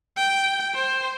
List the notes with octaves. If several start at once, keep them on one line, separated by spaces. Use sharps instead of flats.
G5
C5